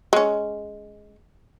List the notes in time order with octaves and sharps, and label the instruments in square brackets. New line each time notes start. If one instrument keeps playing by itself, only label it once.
[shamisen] G#3 C#4